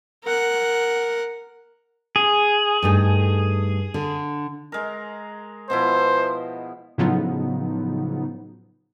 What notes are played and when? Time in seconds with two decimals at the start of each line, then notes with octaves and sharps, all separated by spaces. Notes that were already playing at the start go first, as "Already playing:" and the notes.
0.23 A#4 F#5
2.16 G#4
2.82 G2 A3 D#4
3.94 D3
4.72 G#3 A#4
5.70 B2 F3 E4 C5
6.98 A2 C#3 F3 F#3 B3 D#4